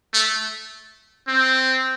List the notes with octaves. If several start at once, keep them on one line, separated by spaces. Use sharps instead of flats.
A3
C4